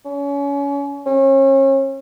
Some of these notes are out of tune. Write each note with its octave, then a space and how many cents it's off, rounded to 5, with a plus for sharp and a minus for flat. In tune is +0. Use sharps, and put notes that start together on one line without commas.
C#4 +30
C#4 -35